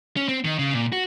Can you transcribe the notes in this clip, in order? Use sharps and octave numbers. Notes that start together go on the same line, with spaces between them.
C#4
C4
D#3
C#3
A#2
F#4